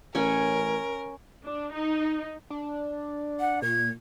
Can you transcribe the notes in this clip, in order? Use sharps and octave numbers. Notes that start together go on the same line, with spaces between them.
A1 C#4 A#4 F#5 G#5
D4
D#4
D4
F#5
A#2 G#6